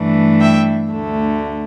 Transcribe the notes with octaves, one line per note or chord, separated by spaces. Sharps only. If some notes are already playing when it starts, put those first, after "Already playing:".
Already playing: G2 E3 A3 D4
E5 G5
D2 D3 A3